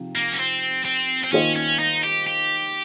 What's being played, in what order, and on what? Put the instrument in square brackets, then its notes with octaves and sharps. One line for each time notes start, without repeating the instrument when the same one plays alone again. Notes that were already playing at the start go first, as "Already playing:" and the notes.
Already playing: [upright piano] C3 F3 D#4
[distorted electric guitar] A#3
C#4
C4
C4
C4
[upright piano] D#3 A#3 F4 C5 D#5 [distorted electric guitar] C#4
[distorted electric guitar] C#4
D#4
G4
G4